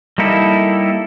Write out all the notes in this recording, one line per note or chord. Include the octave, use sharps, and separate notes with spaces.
G3 A#3 D#4 E4 A4